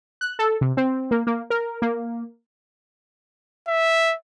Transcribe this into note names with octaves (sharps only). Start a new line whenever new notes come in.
F#6
A4
C3
C4
A#3
A#3
A#4
A#3
E5